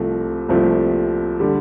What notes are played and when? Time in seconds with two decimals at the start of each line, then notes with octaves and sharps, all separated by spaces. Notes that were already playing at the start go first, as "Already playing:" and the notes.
Already playing: C2 C3 F3 A3
0.49 C2 C3 F3 A3
1.40 D3 G3